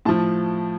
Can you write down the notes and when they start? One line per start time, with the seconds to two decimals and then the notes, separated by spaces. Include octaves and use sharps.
0.05 A2 F3 A5